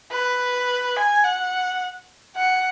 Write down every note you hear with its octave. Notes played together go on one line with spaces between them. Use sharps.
B4
G#5
F#5
F#5